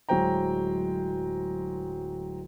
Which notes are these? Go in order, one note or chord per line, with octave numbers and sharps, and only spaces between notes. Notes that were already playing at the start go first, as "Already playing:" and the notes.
D1 F#3 G#3 C5 G5 A#5